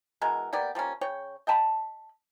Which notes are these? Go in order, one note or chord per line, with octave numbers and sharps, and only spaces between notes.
B2 E3 G#3 A#4
A#3 B3 G4 D5
F3 G3 A#3 C#4
C#3 C#5 G5
D#5 G5 A5 B5